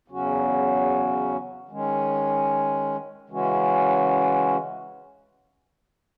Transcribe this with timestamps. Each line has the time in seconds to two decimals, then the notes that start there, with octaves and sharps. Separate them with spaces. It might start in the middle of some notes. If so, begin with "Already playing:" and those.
0.08 E2 C#3 F#3 C#4 F#4
1.69 D#3 G#3 C#4
3.29 C#3 E3 G#3 C#4 F#4